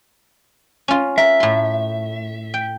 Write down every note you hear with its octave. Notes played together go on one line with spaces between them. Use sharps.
C#4 F4
A#4 E5
A2 C6
G5